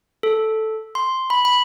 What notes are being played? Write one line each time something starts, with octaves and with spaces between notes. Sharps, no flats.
A4
C6
B5
B5